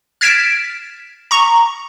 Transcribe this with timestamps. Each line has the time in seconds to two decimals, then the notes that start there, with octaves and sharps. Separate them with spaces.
0.21 F6 G#6 A6 B6 D7 E7
1.31 A#5 C#6